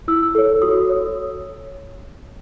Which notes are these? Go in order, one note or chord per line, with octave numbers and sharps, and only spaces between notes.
E4 E6
A4 C#5
F#4 D#6
C#5